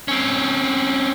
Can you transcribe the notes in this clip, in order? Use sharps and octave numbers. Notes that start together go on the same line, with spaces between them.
C4 C#4